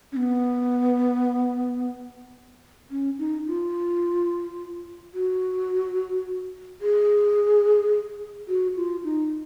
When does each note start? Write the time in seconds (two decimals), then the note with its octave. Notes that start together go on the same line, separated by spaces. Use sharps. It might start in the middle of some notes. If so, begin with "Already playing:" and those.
0.12 C#4
0.17 B3
2.91 C#4
3.19 D#4
3.47 F4
5.14 F#4
6.81 G#4
8.48 F#4
8.77 F4
9.04 D#4